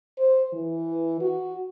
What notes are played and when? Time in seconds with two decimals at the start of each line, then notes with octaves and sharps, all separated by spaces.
0.18 C5
0.53 E3
1.21 F#4